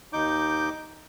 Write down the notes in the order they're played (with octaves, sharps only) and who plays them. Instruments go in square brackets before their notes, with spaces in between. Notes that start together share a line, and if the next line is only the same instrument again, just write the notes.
[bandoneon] D#2 D#4 D6 G6